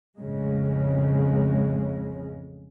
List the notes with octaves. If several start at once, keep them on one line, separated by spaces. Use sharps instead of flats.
A1 F2 C#3 G#3